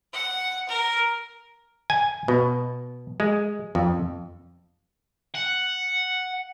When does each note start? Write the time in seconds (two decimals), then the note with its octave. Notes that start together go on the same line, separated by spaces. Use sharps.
0.13 F#5
0.69 A#4
1.90 G#5
2.28 B2
3.20 G#3
3.75 F2
5.34 F#5